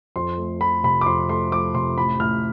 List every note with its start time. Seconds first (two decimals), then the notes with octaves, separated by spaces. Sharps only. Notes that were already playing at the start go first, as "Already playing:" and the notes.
0.16 F2 C6
0.38 A3
0.61 F3 B5
0.84 C3 B5
1.01 D6
1.06 F2 C6
1.29 A3 C6
1.51 F3 D6
1.75 C3 C6
1.97 A1 B5
2.19 A1 F6